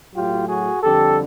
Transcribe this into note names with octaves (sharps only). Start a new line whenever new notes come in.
A2 F#3 F4 G4
F#4 G#4
F2 D3 G3 G4 A4